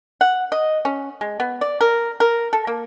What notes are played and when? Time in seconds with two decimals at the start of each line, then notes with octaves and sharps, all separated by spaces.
0.21 F#5
0.52 D#5
0.85 C#4
1.21 G#3
1.40 B3
1.61 D5
1.81 A#4
2.20 A#4
2.53 A4
2.67 A#3